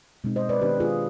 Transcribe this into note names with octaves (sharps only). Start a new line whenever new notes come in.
B2 G#3 C4 D#4
C5 D#5
B4 D5
D#3 B3 D4 G4 B4
F4 G#4